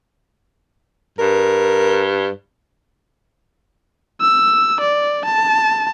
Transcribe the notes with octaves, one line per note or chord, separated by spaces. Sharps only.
G2 A#4
E6
D5
A5